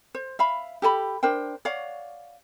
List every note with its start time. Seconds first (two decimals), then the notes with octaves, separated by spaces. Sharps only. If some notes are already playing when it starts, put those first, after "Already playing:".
0.15 C5
0.39 E5 F5 B5
0.82 G4 A4 G#5 B5
1.23 D4 A#4 C5 G5
1.65 C#5 D5 F5 F#5